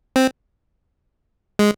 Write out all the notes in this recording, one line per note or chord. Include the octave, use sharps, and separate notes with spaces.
C4
G#3